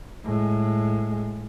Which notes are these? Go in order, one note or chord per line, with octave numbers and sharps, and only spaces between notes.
A2 G#3